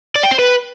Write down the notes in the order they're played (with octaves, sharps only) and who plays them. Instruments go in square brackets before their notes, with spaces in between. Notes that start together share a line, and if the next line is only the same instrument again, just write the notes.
[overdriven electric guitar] D5
G5
C5
B4